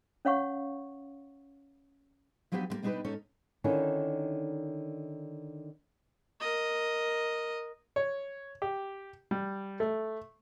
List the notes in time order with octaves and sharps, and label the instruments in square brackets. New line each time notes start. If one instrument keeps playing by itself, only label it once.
[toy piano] C#4 C#5 F5 F#5 C#6
[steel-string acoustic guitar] F3 F#3 B3 D4 G4 B4
D3 G3 A#3
B2 G3 D4 D#4 G4 B4
G#2 C#4 D#4 A4 C#5
[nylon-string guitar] D3 D#3 C#4 D#4 E4
[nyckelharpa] A#4 D#5
[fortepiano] C#5
G4
G3
A3